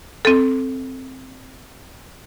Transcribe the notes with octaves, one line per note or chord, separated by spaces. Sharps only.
C4 A4